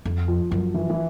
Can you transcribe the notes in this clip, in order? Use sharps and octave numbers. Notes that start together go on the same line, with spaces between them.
F2
F3
F#2 F3
E3
E3